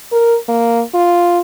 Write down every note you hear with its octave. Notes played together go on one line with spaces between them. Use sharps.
A#4
A#3
F4